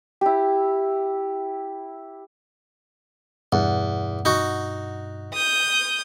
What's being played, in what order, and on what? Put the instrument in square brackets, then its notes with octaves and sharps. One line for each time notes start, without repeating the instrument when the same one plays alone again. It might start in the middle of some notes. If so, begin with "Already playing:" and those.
[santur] E4 G4
[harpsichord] E2 [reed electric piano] G2 B2 F#5
[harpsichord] D#4 F#4
[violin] D#6 G6